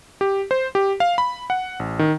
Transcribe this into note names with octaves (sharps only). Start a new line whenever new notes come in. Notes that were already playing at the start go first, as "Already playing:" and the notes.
G4
C5
G4
F5
B5
F#5
A1
D#3